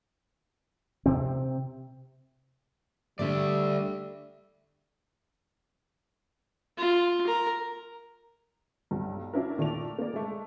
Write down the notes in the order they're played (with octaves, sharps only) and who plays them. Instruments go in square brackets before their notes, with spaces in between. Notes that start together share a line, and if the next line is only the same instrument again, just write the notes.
[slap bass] C3 C4
[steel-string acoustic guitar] D3 A3 [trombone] G3 [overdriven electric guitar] D5 E5
[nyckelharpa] F4
A#4
[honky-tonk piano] B1 G2
C#4 D4 E4 F#4 A#4
A#2 D#3 A3 D5 F7
A#3 D5
G#3 A3